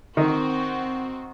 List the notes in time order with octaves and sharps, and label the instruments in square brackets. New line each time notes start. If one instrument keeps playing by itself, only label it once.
[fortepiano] D#3 [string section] C4 F#4